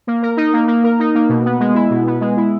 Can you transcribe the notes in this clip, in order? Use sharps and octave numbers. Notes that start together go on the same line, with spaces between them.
A#3
A#4
D#4
A#3
A#3
A#4
D#4
A#3
B2
B3
G#3
E4
B2
B3
G#3
E4